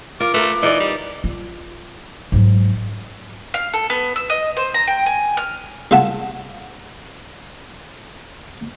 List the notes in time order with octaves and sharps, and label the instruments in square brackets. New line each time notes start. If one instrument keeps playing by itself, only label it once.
[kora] F4 [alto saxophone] A#4 [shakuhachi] D6
[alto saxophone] A3 [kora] A#4 B4
[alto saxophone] E3 [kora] D#4 A#4 D5
[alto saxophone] G3
[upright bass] F4
G#2 F#3
[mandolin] F5
A4
B3
E6
D#5
C5
A#5
G5
G#5
F6
[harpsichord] C2 G#3 F4 E5 F#5 A5